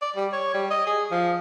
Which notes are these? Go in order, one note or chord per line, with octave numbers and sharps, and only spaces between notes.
D5
G3
C#5
G3
D#5
G#4
F3